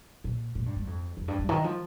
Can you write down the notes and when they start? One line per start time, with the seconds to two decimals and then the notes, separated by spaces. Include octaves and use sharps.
0.24 A#2
0.55 A#2
0.66 G2
0.76 G2
0.87 F2
1.17 F2
1.28 G2
1.39 G2
1.49 D#3
1.64 F3